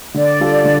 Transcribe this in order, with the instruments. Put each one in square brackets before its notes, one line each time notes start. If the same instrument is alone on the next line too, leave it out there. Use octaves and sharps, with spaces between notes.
[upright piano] D3 [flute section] D5
[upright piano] G3 D4 F4 A4
D3